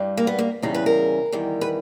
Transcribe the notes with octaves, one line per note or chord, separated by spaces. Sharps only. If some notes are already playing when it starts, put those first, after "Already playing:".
Already playing: G2 G3
A#3
B3
A#3
E2 C#3 G3 D#4
B4
A#4
E2 D#3 G3
B4